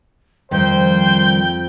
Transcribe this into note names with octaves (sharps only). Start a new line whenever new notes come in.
F2 D#3 G3 C5 G5